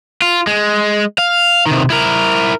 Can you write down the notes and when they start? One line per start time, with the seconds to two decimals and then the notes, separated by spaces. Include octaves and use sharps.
0.22 F4
0.47 G#3
1.18 F5
1.66 C3 D#3
1.90 E4 A#4